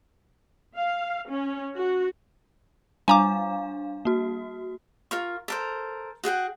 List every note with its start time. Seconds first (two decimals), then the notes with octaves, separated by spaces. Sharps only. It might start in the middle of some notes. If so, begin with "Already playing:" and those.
0.76 F5
1.29 C#4
1.77 F#4
3.08 G3 D4 F5 G#5 A#5 D6
4.05 A#3 F#4
5.11 F4 A#4 C#6
5.48 A4 A#4 C5
6.24 F#4 G#4 F#5 G5